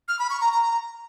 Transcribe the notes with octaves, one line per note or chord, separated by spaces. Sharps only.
F6
B5
C#6
A#5
A#5